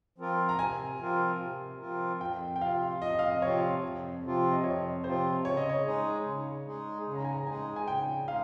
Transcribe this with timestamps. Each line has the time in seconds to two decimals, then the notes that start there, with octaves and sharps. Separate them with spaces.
0.18 F3 C4 F4 A#4
0.49 A#5
0.59 C3 G#5
0.99 F3 C4 F4 A#4
1.40 C3
1.80 F3 C4 F4 A#4
2.21 F2 G5
2.56 G5
2.61 C3 F3 C4 F4 F5
3.02 F2 D#5
3.19 F5
3.30 D#5
3.42 C3 F3 C4 F4 C#5
3.82 F2
4.23 C3 F3 C4 F4
4.52 D#5
4.64 F2 C#5
5.04 C3 F3 C4 F4 C5
5.45 C#3 C#5
5.57 D#5
5.69 C#5
5.85 G#3 D#4 G#4
6.25 C#3
6.66 G#3 D#4 G#4
7.07 C#3
7.15 A#5
7.25 G#5
7.33 A#5
7.47 G#3 D#4 G#4 G#5
7.76 G#5
7.87 C#3 G5
8.28 G#3 D#4 F5